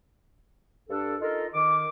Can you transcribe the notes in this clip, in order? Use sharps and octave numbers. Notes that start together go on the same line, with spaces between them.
G2 D4 A4
D#4 F4 A4 A#4 D#5
D#3 D6